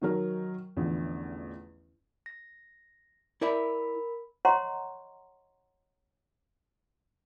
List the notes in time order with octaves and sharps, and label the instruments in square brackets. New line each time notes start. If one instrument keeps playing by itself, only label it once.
[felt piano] D#3 F#3 A#4
A1 E2 D3 F3
[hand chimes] A#6
[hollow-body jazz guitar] E4 D5 E5 [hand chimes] A#4 B5
[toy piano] C#5 D#5 F#5 A#5 C6 C#6